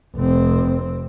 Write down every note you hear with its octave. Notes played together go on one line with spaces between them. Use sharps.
F1 C4